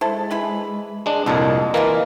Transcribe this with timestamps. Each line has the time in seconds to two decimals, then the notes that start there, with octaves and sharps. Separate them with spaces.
0.01 G#3 E4 A4 C5
0.31 E3 E4 B5
1.06 G#3 D4
1.26 C2 F2 A#2 D3 F#3 A4 D#5
1.74 E3 A#3 F4 F#4 A#4